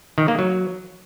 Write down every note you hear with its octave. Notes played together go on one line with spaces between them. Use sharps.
D#3
A#3
F#3